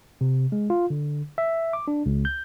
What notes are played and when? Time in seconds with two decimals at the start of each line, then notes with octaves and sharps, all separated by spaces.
0.21 C3
0.52 G#3
0.70 F4
0.90 D3
1.38 E5
1.73 D6
1.88 D4
2.06 C#2
2.25 G6